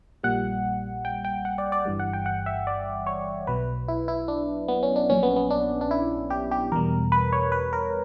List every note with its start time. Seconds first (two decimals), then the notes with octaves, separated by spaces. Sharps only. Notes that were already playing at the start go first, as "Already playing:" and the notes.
0.23 A#1 A#2 G3 F#5
1.05 G5
1.25 G5
1.45 F#5
1.58 D5
1.72 D5
1.85 G1 G2 E3 G3
1.99 F#5
2.13 G5
2.26 F#5
2.46 E5
2.67 D5
3.07 C#5
3.47 B1 B2 F#3 B4
3.88 E4
4.08 E4
4.28 D4
4.68 B3
4.83 C#4
4.96 D4
5.09 A#1 A#2 F#3 C#4
5.23 B3
5.36 B3
5.50 D4
5.81 D4
5.91 E4
6.30 G4
6.51 G4
6.72 E2 B2 G3 A#4
7.12 B4
7.33 C#5
7.52 B4
7.73 A#4